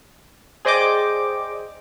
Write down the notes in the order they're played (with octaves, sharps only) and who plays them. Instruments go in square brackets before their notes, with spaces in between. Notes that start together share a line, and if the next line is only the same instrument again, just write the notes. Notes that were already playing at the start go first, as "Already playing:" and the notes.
[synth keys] G#4 C5 D5 D#5 G5 D6